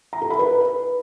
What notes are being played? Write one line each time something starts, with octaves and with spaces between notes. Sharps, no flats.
A#5
A4
B5
B4